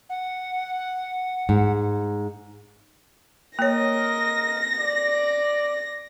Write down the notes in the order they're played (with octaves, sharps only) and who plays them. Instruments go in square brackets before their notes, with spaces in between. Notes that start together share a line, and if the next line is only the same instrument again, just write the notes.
[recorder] F#5
[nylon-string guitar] G#2
[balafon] A#3 C#5 [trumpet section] A#4 D#5 [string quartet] A#6
[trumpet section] D5